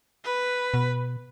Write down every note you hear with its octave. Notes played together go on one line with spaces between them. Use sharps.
B4
B2